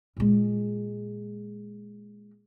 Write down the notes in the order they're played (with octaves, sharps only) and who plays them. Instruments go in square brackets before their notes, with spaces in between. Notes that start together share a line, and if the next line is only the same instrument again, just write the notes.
[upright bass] A#2 G#3